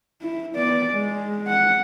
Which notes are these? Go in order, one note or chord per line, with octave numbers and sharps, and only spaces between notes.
E4
B3 D5
G#3
F#5